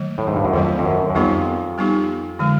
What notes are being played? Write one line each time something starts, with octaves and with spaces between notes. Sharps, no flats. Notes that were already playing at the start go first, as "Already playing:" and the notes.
Already playing: D#3 F#3 A3
A2
G#2
G2
F#2
F2 D#3 F#3 A3
F2
F#2
F#2
F2 G3 B3 D#4 G4
G3 B3 D#4 G4
D3 F3 G#3